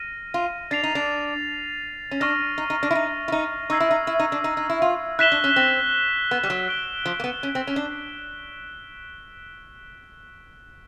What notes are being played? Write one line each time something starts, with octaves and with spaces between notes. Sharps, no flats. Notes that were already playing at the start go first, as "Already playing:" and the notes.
Already playing: F6 A#6 D#7
F4
D4 A6 C7 F7
D#4
D4
C#4
D4 C#6 F6 A#6
D#4
D#4
D4
E4
D#4
E4
D#4
D#4 C#6 E6 G#6 C7
E4
D#4
E4
D#4
D4
D#4
D#4
E4
F4
E4 F#6 B6 E7 G7
D4
C#4
C4
B3
G3
F#3
F#6 B6 D7 G7
F3
A#3
B3
C#4
C4
C#4
D4